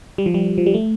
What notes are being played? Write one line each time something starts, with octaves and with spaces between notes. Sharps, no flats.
G3
F3
G3
F3
G3
A3